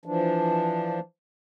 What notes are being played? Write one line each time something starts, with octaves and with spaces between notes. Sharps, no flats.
E3 F3 D4